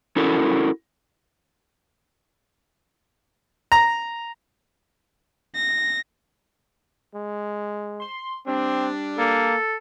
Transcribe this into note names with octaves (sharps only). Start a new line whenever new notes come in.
C#4 E4 F#4 A4 A#4
A#5
A#6
G#3
C6
G3 C4 D4
A#3 A4